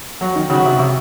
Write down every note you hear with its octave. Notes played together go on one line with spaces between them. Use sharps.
F#3 F#4
D#3
C#3 F#4
C3
C3